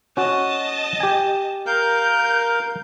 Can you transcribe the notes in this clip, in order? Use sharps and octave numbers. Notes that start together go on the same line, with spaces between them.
C#4 F#4 D#5 A5
G4 G#5
A#4 F5 G6